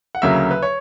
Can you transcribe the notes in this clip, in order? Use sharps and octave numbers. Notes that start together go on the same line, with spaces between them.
F#5
D2 C#3 F#3 A#3 E5
B4
C#5